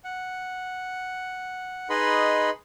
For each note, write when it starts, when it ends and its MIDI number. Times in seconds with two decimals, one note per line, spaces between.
0.04 1.88 78
1.90 2.50 63
1.90 2.50 68
1.90 2.50 71
1.90 2.50 75
1.90 2.50 83
1.90 2.50 84